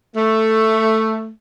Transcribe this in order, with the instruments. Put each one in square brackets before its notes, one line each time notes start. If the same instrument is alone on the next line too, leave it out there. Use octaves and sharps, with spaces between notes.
[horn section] A3